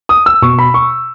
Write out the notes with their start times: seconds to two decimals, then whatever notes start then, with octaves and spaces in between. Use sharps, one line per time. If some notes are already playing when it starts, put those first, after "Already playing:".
0.09 D#6
0.26 E6
0.42 B2 C#6
0.59 B5
0.74 C#6